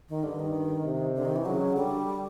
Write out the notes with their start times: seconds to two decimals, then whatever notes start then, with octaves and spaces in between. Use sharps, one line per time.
0.09 D#3
0.23 G2 D3
0.39 D#3
0.85 C3
1.15 D3
1.25 D#3
1.36 E3
1.45 C#3 F#3
1.76 D3 G3